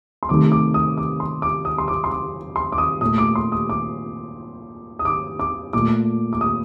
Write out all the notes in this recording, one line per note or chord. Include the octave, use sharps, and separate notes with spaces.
C6
C3 D#3 A3 D6
D6
D#6
D6
C6
D6
D#6
C6
D6
C6
D6
C6
D6
D#6
A#2 A3 D#6
D6
C6
D#6
D6
D#6
D6
D6
A#2 A3 D6
D6
D#6